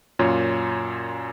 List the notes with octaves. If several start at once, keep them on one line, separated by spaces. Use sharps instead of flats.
F#2 A#2 F4 C#5